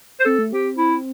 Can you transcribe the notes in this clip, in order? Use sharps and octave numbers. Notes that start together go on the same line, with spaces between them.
C5
C4 A4
A3
C4 G4
E4